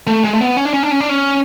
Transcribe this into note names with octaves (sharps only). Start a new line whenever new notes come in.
A3
G#3
A3
B3
C#4
D4
C#4
D4
C#4
D4
C#4